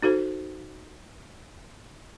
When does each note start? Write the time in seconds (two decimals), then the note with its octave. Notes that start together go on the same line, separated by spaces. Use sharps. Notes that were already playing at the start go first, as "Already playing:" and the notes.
0.02 D#4 F#4 A4 C5